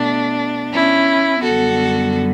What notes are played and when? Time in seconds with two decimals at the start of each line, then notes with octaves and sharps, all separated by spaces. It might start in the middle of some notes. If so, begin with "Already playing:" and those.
Already playing: B2 A3 D4
0.73 C#4 E4
1.42 F#2 D3 G3 B3 F#4 A4